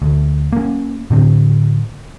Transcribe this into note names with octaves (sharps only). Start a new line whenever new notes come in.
D2
A#3 C#4
A2 D3 C4